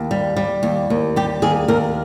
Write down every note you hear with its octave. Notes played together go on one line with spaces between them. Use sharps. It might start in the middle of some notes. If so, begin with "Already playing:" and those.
Already playing: D#2
G3
G3
D#2
D#2
G3 G4
D#2 G#4
D#2 A#4